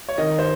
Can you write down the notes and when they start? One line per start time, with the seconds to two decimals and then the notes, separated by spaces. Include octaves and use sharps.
0.09 C#5
0.18 D#3 D#5
0.39 C5